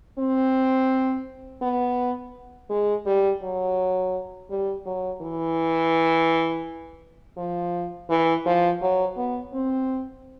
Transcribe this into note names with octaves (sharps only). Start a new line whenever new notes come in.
C4
B3
G#3
G3
F#3
G3
F#3
E3
F3
E3
F3
F#3
B3
C4